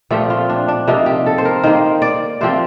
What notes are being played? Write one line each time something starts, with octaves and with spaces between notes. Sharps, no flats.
A#2 F3 A3 C4 G4
F4
D4
D4
C3 F3 A#3 D#4
G4
A4
C5
A#4
D#3 A#3 C5
D5
C3 F3 C4 C5